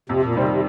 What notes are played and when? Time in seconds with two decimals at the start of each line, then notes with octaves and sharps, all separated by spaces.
0.09 F2 C3
0.22 A#2
0.35 C3 D#3 G3 C4
0.43 A#2
0.49 C3